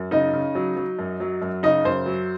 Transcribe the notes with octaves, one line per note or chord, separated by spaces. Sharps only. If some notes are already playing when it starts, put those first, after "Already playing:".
Already playing: F#2
C#3 D#4 D#5
C#3
F#3
F#3
F#2
F#3
F#2
C#3 D#4 D#5
F#2 C5
F#3